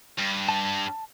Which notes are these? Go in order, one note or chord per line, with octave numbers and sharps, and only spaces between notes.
G2
A5